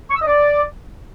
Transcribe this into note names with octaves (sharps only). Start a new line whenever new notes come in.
C#6
E6
D#5
D5